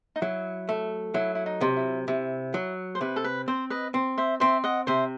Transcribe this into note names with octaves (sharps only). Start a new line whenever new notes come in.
D#4
F#3 E4
A3
F#3 E4
E4
D#4
C3
E4
C3 E4
F#3
C5
C3 B4
A4
B4
C4 C5
B4 D#5
C4
C5 E5
C4 C5 E5
D#5 F#5
C3 C5 E5